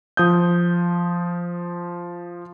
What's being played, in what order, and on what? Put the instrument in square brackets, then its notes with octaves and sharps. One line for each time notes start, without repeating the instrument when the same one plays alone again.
[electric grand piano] F3 D#6 G6